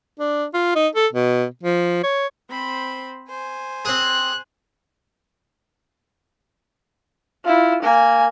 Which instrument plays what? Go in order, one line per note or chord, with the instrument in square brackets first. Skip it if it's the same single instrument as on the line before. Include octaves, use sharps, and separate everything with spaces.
[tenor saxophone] D4
F4
D#4
A4
B2
F3
C#5
[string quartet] C4 C5 B5
C5 G#5
[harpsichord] C4 G#4 [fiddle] F#6
[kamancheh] E4 F4
A#3 G#5